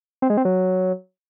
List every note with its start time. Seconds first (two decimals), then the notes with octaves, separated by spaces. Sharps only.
0.22 C4
0.30 G#3
0.37 C4
0.45 F#3